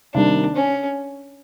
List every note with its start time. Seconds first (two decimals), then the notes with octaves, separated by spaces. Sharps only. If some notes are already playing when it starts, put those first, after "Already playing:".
0.14 C3 D#3 G3 A#3 D4
0.56 C#4